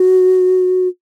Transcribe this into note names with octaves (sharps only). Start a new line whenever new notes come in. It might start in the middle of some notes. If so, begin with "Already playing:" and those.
Already playing: F#4